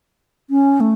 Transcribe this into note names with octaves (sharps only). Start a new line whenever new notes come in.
C#4
A3